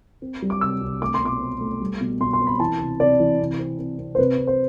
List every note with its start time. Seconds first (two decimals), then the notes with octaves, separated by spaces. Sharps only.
0.22 C4
0.42 G3
0.50 D6
0.61 C3 E6
0.81 C2
1.01 A3 D6
1.14 C6
1.21 B2 D6
1.40 C4
1.61 A3
1.81 G3
2.01 B2
2.21 B2 C6
2.33 C6
2.40 C4
2.47 B5
2.60 E3 A5
2.80 C3
3.00 C3 D5
3.20 E3
3.39 C3
3.59 C4
3.79 C4
3.99 C4
4.15 C5
4.18 C3 B4
4.38 C3
4.47 C5